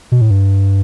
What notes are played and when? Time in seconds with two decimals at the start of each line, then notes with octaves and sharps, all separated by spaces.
0.12 B2
0.21 A2
0.30 G2